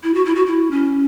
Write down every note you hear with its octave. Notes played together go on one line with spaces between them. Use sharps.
E4
F#4
E4
F#4
E4
C#4